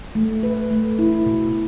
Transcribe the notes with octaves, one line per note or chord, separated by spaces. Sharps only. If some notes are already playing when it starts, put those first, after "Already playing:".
A3
B4
A3
E4
B2